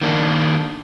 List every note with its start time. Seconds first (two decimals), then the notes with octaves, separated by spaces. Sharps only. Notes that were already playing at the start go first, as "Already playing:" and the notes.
0.01 D#3 A#3 D4